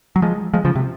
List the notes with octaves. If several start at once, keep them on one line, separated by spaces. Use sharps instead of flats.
F#3
F3 G#3
F3 G#3
C#3 F3
C3